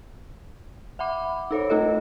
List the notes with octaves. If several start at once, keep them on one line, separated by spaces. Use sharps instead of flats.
E5 F#5 B5 D6
D#4 A4 C5 C#5
A3 D#4 F4 A4 D#5